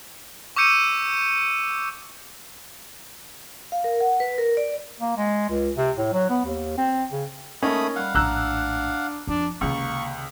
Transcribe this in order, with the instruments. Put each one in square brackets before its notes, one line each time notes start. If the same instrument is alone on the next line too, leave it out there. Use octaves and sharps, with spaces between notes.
[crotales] C#6 D6 E6 G6 C#7 D#7
[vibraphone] F5
A#4
F#5
B4
A#4
D5
[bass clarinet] A#3
G#3
C#2
C3
A2
F#3
B3
D#2
C4
C#3
[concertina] A3 B5 D#6 [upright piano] A#3 C#4 D#4
[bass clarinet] G3 [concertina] F5 F#5
[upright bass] A#1 A2 [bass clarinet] D4 [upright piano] A#5 E6 F#6
[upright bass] F2 [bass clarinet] D4
[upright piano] C#2 [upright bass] C3 D#3 [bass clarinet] A#3 [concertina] C#6